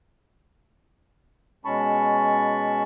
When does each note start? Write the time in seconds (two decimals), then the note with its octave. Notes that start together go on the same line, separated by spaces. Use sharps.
1.65 B2 G#3 C#4 A5 B5 C#6